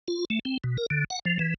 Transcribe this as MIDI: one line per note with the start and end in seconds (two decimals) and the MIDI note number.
0.08 0.25 65
0.30 0.39 57
0.45 0.58 60
0.64 0.77 47
0.78 0.86 70
0.90 1.04 50
1.10 1.19 78
1.25 1.38 53
1.39 1.54 52